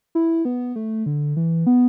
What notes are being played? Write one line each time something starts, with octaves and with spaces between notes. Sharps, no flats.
E4
B3
A3
D3
E3
B3